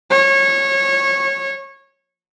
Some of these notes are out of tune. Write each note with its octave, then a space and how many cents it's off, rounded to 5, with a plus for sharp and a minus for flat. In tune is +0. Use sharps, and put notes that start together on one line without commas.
C#5 -20